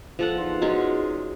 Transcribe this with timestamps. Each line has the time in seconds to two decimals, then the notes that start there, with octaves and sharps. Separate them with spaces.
0.19 F3 A4 F#5
0.36 E2 D#4 F4
0.62 F#3 G#3 C#4